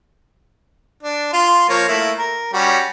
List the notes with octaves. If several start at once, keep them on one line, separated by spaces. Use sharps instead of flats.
D4
F4 C6
F3 A#3 C#5
A3 A#3 E4
A#4
G3 C#4 F#4